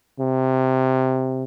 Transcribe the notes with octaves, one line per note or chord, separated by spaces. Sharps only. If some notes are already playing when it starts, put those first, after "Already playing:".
C3